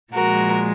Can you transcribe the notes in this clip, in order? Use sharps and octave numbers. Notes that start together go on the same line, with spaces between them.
A#2 F3 G#3 F#4 A#4